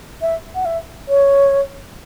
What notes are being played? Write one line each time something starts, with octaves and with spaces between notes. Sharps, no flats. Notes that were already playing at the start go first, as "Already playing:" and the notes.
E5
F#5
E5
C#5